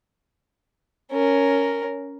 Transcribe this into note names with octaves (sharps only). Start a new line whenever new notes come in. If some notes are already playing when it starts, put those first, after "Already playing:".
C#4 A#4